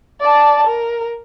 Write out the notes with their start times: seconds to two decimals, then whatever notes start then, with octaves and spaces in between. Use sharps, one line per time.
0.21 D5 A5
0.67 A#4